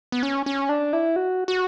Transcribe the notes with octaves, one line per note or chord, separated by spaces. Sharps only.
B3
C#4
C#4
D4
E4
F#4
F#4